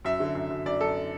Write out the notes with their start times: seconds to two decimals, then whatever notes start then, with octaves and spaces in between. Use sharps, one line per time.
0.05 F#2 E5
0.20 D3
0.35 F#2
0.50 F#2
0.66 F#2 D5
0.81 F#2 A4